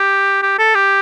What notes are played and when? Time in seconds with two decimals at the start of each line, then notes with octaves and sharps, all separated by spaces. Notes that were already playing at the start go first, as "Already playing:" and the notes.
Already playing: G4
0.42 G4
0.58 A4
0.75 G4